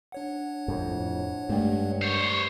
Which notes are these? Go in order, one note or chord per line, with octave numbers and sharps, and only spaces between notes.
D4 C#5 F#5
F2 A2
G2 G#3 A3
C5 C#5